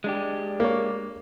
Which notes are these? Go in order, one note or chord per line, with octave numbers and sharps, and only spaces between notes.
G#3 D4 G4
A#3 C#5